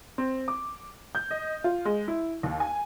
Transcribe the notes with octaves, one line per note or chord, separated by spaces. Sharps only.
C4
D6
G6
D#5
F4
G#3
E4
D#2
G#5